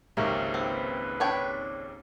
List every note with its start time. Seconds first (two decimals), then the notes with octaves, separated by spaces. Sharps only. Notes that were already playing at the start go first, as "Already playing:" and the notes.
0.17 G#1 C#2 G#2 C3 A#3 C#4
0.54 C4 B4
1.20 D4 C#5 G5